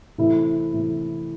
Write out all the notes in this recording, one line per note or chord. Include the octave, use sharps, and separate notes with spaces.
C3 E3 A3 E4
C3 E3 A3 E4